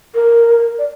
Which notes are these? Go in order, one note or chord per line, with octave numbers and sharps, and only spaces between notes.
A#4
D5